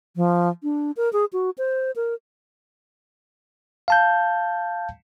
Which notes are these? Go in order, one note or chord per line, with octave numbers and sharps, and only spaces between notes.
F3
D4
A#4
G#4
F#4
C5
A#4
F5 A5 G6